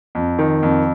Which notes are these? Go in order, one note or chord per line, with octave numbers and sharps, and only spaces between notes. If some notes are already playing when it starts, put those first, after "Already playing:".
F2
D#3
F2